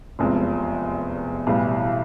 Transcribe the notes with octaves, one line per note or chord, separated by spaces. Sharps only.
F1 E2 C3 F3 G#3
B1 A2 E3 G3